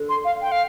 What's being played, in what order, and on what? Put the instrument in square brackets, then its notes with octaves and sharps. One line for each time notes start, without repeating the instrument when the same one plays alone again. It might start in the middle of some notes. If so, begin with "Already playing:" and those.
Already playing: [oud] D3
[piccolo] C6
F5
G5
F5